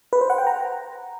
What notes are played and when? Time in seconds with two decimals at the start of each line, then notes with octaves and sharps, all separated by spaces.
0.13 B4
0.21 C5
0.30 F#5
0.38 G5
0.47 A#5